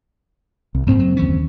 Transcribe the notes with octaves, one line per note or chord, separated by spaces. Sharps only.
C2
F#1 D2 G#2 C4
F#3
D#2 E3 C#4